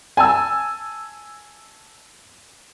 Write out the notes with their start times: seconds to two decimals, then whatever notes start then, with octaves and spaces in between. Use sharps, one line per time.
0.17 G#5 A5 E6